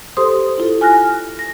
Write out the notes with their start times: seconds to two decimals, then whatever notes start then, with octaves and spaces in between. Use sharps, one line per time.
0.17 G4 A4 C5 C6 D#6
0.58 E4 F4 A4
0.81 G#5 F6 F#6 A#6
1.39 A#6